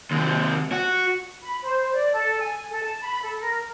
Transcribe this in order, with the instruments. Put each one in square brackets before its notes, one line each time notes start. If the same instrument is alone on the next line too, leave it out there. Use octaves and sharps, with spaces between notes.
[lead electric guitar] D#2 C3
F#4
[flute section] B5
C5
D5
A4
G#5
A4
A5
B5
A4
A#4